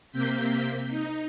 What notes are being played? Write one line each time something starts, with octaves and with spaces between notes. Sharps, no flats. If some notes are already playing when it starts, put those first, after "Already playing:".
C3 A#3 C4 G6 B6
D#4